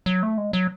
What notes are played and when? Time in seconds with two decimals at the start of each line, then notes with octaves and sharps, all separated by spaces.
0.06 F#3
0.23 A3
0.38 G#3
0.53 F#3